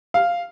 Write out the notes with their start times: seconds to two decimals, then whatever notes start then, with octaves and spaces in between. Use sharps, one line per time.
0.14 F5